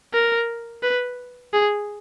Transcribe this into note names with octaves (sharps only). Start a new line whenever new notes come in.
A#4
B4
G#4